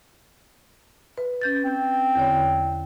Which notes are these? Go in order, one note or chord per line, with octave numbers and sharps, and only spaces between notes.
B4
C#4 G6 A6
C4
E2 D3 C#5